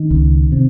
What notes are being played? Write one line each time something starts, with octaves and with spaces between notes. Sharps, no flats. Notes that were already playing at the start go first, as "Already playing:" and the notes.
Already playing: D#3
C#2
C3